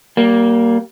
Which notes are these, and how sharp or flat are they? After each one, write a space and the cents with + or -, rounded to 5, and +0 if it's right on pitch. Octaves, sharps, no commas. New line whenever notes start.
G3 -30 A#3 +0